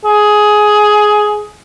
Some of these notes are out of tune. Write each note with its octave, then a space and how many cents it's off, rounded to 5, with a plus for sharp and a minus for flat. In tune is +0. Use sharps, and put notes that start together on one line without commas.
G#4 +15